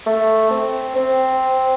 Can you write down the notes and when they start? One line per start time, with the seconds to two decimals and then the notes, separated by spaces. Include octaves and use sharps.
0.06 A3
0.51 C4
0.96 C4